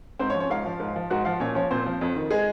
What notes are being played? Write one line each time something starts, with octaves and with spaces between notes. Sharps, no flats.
G#2 C4 C5
C#4 C#5
F3
C#4 C#5
G#2 F4 F5
F3
G#2
F3
G#2 F#4 F#5
F3 F4 F5
A#2 C#4 C#5
F3 C#4 C#5
A#2 C4 C5
F3
F2
D#3
G#3 G#4